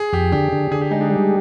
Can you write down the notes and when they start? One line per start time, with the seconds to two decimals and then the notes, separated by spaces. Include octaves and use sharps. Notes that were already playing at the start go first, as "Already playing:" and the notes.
Already playing: G#4
0.13 F2 G4
0.32 D3 G4
0.52 D3
0.71 D3 G#4
0.81 G4
0.91 G#3 D#4
1.01 D4
1.10 G3